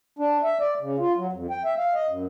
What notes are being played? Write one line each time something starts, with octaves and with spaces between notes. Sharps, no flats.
D4
E5
D5
C#3
F4
F#3
F2
G5
E5
F5
D#5
F#2